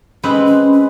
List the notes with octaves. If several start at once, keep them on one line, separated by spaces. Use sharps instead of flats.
G#3 C4 C#4 B4
C#4
C#4